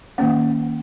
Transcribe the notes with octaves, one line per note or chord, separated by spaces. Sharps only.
D#3 A#3 C#4 F#5